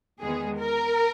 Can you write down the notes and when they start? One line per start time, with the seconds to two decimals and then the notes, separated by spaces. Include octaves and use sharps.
0.21 E2 D#3 G#3 B3 G#4
0.58 A#4